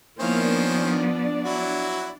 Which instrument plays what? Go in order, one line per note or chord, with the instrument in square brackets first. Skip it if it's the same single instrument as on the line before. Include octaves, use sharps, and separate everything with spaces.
[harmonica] D#3 C#4 C5 [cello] F3 B3 [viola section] A#3 E4 F5
[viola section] D4 D5
[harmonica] F#3 E4 F#4